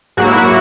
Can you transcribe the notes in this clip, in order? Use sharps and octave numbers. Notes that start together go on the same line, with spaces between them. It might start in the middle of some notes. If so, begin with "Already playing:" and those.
G#2 F#3 A#3 F#4
E4
F#4